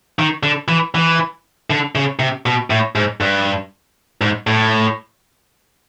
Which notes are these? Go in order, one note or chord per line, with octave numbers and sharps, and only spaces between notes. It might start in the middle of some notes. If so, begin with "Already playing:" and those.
D#3
D3
E3
E3
D3
C#3
C3
B2
A2
G#2
G2
G#2
A2